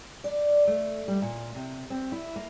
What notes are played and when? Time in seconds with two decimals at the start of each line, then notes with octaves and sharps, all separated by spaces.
0.24 D5
0.67 A3
1.08 G3
1.22 A#2
1.55 C3
1.90 C4
2.12 E4
2.36 A#3